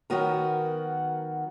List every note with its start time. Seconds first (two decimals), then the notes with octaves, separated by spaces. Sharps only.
0.10 D#3 F#3 B3 F#4 A#4